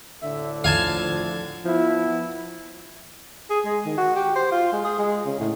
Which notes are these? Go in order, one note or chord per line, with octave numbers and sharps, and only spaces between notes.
D2 A2 D3 E5
F3 F5 G#5 A5
F3 B3 E4
G#4
G#3
D#3
F#4
G4
C5
F4
G#3
G#4
G#3
C#3
A2